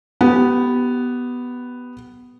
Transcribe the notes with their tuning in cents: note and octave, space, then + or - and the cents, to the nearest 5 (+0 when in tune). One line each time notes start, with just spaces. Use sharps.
B3 +0 G4 -20